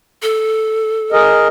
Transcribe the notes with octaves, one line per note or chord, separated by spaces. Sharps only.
A4
G#4 A#4 D#5